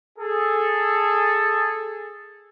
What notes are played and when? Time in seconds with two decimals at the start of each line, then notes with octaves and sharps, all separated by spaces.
0.18 G#4 A4